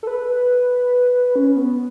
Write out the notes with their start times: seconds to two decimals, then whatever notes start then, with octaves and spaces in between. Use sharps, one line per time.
0.03 A4
0.07 B4
1.36 C#4
1.56 B3